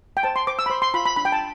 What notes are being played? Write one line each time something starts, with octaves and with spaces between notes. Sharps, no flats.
G5
C5 A5
C6
C5 D6
E6
B5
C5 C6
C6
F4 B5
B5
D4 B5
G5
A5